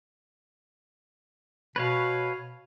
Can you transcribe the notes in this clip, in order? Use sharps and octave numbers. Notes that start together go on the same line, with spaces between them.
B2 B4 C#5 F5